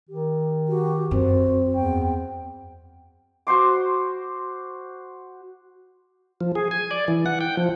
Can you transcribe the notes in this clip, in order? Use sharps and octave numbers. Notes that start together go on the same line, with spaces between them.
D#3 G4
F#4 G4
F#2 C4 F#4
E2 G5
F#4 C5 C6 D6
F3
G#4
G#5
D5
E3
F#5
G5
F3